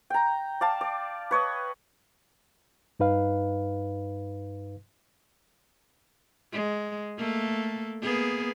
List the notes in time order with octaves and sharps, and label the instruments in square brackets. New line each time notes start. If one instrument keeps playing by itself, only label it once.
[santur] G5 A#5
D5 F5 A5
D5
B4 C#5 D#5
[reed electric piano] G2 D#4 B4 F5
[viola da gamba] G#3
A3 A#3 A4
A#3 B3 G#4